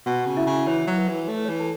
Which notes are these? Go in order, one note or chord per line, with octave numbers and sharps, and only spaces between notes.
B2 F#4 F#5
C#3
E4 E5
C#3
E3 C#5
F#3
B4
E3
A3 C#5
B4
E3 C#5
A4 A5